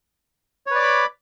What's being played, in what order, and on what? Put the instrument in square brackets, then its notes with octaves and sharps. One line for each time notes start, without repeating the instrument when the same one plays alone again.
[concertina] C#5
B4
D5
D6
B5